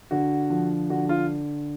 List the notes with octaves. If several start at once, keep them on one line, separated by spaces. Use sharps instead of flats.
D3 F#4
F3
D3 F#4
F4